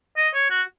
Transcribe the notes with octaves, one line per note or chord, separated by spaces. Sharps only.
D#5
C#5
F#4